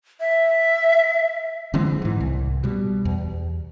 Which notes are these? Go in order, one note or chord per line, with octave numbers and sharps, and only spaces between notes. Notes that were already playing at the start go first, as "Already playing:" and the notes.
E5
D3 E3 G#3 C4
G#2 E3
C2
B2 G3
E2